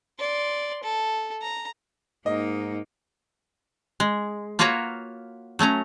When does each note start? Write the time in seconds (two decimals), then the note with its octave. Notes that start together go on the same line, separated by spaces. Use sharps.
0.20 D5 C6
0.83 A4
1.42 A#5
2.26 G#2 A#3 D#4 D#5
4.00 G#3
4.59 A#3 F4 F#4 B4 C#5 A#5
5.59 F#3 A3 C#4 A#5